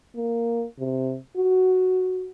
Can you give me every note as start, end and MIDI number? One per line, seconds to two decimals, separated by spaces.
0.15 0.64 58
0.79 1.16 48
1.37 2.29 66